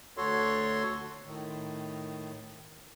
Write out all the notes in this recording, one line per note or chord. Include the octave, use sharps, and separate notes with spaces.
D2 F#4 A4 C#5 C6
A2 D#3